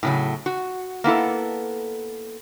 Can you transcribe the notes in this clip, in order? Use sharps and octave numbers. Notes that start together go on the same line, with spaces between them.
A2 C#3 F#3
F#4
A#3 B3 E4 A4